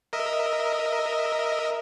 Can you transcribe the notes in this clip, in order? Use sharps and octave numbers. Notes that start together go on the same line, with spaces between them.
A#4 D#5 E5